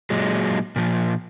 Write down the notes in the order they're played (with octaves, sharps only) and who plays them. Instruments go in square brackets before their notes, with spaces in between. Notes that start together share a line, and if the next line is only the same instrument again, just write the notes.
[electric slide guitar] A#2 F#3 G#3
A#2 F3